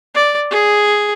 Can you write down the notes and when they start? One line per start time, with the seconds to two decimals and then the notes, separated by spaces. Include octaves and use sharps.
0.15 D5
0.51 G#4